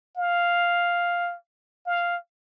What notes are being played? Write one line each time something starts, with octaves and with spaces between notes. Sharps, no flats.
F5
F5